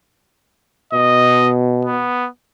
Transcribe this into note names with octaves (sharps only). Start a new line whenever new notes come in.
B2 D#5
B3